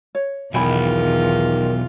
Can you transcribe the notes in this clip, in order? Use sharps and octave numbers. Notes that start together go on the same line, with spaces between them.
C#5
B1 E2 D#3 F4 G5 G#5 B5